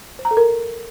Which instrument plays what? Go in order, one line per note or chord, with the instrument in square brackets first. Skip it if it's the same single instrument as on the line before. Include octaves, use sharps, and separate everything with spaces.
[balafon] C5
A#5
A4
A#4